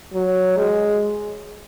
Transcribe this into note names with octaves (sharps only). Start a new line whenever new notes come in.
F#3
G#3